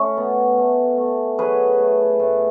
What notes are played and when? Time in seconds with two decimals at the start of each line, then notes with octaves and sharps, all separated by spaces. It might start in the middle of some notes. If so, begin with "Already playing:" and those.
Already playing: A3 C#4
0.17 B2 B3
0.58 A3
0.97 A3
1.38 F#3 G#4 B4
1.79 A3
2.19 A2